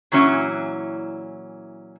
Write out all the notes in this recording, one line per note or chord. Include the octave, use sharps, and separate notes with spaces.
A#2 E3 F#3 C#4 E4